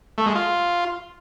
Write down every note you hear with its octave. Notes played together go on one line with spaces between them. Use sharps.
A3
G#3
F4